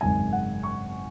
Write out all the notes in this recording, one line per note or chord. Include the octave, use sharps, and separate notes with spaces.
G#1 F#2 C#3 G#3 G#5
F#5
C#6